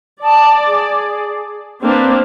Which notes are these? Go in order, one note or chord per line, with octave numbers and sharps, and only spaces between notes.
D5 A5 D#6
G#4
A#3 C4 D4 B4